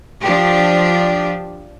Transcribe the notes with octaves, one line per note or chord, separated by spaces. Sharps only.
F3 D4 G4